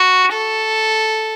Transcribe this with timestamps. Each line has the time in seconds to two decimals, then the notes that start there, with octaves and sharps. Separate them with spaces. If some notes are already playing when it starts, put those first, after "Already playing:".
Already playing: F#4
0.33 A4